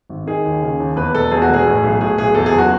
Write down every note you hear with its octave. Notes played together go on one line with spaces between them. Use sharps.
G#1
D#3 G#4
D#2
C#3
D#2
E2 B4
E1 A4
E2 G#4
F#4
E1 G#4
A2
B1
A2 G#4
B1 G#4
E2 A4
G#4
F#1
F#4